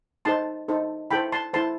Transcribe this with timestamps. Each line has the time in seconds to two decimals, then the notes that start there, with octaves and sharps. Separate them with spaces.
0.25 D#4 A4 C5 A5 C6
0.68 D#4 A4 C5
1.11 E4 A4 C5 G5 B5
1.32 A5 C6
1.53 E4 A4 C5 A5 C6